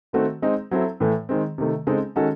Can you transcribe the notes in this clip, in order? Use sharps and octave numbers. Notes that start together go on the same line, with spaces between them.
D#3 A3 C4 F#4
G#3 C4 D#4
F#3 C4 E4 A4
A2 E3 A3
D#3 G#3 C4
C3 D#3 A3
C#3 G#3 C4 D#4 A4
D#3 G#3 C#4 F#4 A4